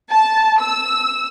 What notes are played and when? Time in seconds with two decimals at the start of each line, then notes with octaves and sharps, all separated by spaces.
0.11 A5
0.61 E6